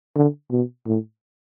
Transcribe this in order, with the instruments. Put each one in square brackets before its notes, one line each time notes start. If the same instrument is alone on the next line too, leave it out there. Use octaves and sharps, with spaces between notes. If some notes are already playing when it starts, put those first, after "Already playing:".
[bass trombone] D3
B2
A2